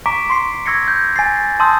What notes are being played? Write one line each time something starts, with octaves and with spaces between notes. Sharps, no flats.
A#5 C#6 D6 B6 D7
C6 C#6 C7
C#6 E6 G#6 A#6 C7 C#7
G6
G#5 A6 C7
A5 C6 D#6 E6 G6